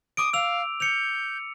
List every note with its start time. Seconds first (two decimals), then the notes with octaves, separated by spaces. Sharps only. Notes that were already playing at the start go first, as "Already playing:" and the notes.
0.17 D6 D#6 D7
0.33 F5 E6 F7
0.80 G6 C#7 F7